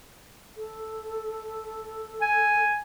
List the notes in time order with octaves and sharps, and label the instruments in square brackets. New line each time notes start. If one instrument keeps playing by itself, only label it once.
[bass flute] A4
[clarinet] G#5